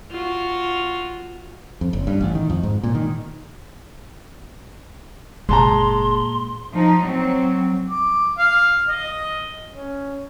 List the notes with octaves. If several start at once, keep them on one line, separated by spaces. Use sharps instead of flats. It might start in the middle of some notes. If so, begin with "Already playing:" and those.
F4 F#4
F2
F#1
G2
A1
D#3
F2
G#2
A#2
D#3
F#1 A#2 G#3 A5 A#5 C6
F3 D#4
F#3 C4
D6
F5
D#5
C#4